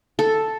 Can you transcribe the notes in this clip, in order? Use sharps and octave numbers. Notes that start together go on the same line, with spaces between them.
A4